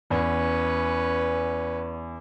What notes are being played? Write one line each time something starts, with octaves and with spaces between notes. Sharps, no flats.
E2 C#4 B4